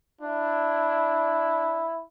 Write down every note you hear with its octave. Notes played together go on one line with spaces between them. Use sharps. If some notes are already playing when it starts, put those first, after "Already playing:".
D4 E4